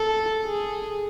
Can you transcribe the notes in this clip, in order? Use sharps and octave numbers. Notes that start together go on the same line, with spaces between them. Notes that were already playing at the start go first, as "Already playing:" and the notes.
Already playing: A4
G#4